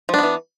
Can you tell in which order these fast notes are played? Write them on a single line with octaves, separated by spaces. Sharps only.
F3 D4 B3 E3